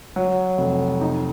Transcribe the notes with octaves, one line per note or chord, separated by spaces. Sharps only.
F#3
F1
D#4